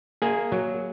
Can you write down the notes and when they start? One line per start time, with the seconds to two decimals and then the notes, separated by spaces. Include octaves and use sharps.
0.22 A#3 G#4 G#5
0.52 F#3